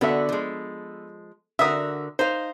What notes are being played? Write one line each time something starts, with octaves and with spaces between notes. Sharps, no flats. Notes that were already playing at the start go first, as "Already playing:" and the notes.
D3 B3 F#4 A4 E5
F3 G#3
D3 F#4 A#4 E5 D#6
D#4 C5 F5